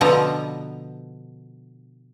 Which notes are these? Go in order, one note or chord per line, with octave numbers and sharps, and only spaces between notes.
B2 D3 F3 B3 A#5